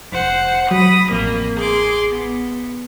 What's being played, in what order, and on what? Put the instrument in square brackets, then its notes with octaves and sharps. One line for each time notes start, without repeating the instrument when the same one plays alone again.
[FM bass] F1 [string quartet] C5 F#5
[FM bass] F#3 [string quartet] B5 D#6 A#6
[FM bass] A1 [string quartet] F2 A#3
[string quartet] G#4 C6 D6
B3